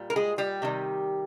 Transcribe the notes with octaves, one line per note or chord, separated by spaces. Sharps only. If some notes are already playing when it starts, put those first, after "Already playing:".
Already playing: A#2 G3
A#4
G#3 G#4
G3 G4
C3 D#3 G3